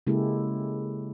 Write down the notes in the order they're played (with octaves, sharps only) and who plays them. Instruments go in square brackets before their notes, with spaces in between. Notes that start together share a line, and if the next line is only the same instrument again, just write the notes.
[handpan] C#3 G#3 A#3 E4 G4 A4